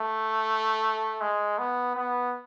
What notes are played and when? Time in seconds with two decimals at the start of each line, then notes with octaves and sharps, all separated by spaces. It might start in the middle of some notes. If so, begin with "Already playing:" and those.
Already playing: A3
1.21 G#3
1.58 B3
1.95 B3